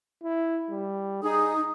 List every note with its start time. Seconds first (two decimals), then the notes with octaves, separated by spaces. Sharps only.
0.23 E4
0.70 G3
1.23 D#4 G#4 D#6